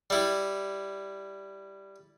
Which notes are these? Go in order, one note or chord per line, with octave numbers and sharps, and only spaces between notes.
G3 E4